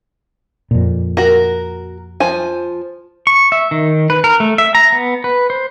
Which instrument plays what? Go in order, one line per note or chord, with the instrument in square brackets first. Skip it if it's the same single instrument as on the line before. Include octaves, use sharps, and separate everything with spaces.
[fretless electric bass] F2 A#2
[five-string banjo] F#4 A#4
F3 C5 G#5
[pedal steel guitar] C#6
E5
D#3
B4
A#4
A3
E5
A#5
B3
B4
C5